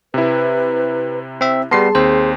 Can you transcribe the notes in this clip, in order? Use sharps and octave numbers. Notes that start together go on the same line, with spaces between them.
C3 E4 B4
C4 E5
G3 B3 G#4 A5 C6 C7
D#2 C4 C5